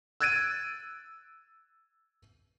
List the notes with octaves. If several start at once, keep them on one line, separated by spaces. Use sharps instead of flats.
E6 F#6 G#6 A6 D7 D#7